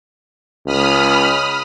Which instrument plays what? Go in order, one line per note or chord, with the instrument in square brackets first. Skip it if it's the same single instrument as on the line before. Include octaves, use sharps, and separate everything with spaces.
[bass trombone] C#2 [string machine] B5 D#6 F6